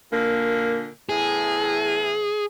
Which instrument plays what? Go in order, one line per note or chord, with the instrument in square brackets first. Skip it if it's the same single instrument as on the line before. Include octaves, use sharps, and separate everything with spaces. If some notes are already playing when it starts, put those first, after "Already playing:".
[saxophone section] A#2 D3 A#3
[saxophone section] E2 A2 E4 [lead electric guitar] G#4